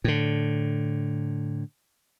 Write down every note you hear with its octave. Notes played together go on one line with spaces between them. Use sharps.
A2 D3